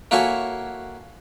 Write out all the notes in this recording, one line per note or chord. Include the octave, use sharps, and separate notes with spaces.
A#3 E4 F#4 A4 C#5 G#5